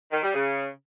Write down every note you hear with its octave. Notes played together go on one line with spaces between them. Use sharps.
D#3
G3
C#3